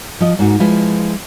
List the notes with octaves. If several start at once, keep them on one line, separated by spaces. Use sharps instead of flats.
F3 D#5
G#2 A#3 F#4
F3 G#3 E4 F4 B4